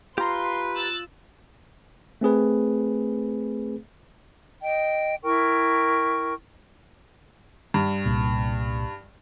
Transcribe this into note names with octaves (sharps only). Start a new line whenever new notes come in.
F4 G4 B4 A#5 C6
E6 F#6 A6
A3 C4 G#4 B4
D#5 G5
E4 A#4 G5 C#6
G2
C2 A#2